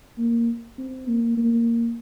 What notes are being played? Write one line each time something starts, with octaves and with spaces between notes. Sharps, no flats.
A#3
C4
A#3
A#3